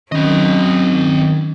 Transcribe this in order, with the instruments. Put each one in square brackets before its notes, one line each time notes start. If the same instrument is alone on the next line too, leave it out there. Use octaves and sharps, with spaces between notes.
[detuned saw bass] D#3 [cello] F#3 [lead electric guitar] C4 D#5 [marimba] C#4